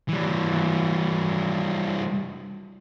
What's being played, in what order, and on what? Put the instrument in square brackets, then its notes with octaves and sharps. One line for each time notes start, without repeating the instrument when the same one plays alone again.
[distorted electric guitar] E3 G3